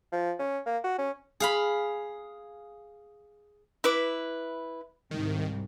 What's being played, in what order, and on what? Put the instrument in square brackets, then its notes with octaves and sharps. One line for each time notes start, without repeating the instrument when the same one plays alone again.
[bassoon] F3
C#4
A#3
F#4
C#4
[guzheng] G#4 F5 B5
[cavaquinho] E4 B4 D6
[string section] C2 G#2 [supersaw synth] D#3